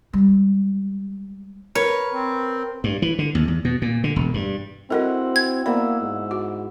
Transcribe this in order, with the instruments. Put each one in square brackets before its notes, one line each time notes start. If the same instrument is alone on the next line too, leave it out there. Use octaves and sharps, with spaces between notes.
[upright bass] G3 G#3
[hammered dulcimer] A#4 [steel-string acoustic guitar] B4 [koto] C#5
[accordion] C4
[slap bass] G2
E3
D3
D#2
E2
B2
A#2
D3
E1
G2
[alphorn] C4 [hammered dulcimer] E4 F#4 F#5 [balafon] A4 A#4 D#5
[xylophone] G#6
[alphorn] A#3 [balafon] B3 D5 B5 [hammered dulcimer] E5 F#5
[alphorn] G#2
[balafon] F#4